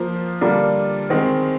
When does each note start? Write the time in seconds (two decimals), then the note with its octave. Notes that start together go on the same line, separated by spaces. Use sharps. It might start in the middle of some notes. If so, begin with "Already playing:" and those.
Already playing: F3 A#3 F4 C5
0.41 D3 G3 A#3 D4 F4
1.10 D#3 G#3 C4